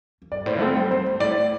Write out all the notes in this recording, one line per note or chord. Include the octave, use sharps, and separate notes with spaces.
E2
G2 D5
A2 C5
C4 A4
G3 C5
G3 C5
G2
A2 D5